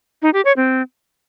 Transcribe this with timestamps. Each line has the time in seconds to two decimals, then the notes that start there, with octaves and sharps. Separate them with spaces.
0.22 D#4
0.34 G4
0.45 C#5
0.56 C4